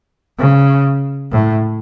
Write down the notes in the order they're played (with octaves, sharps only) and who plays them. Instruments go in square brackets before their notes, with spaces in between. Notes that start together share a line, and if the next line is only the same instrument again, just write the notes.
[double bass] C#3
A2